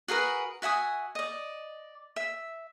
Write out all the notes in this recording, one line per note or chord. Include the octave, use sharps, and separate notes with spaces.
F#4 G#4 A#4 B4
F#4 E5 G#5 D#6
D5 D#5
E5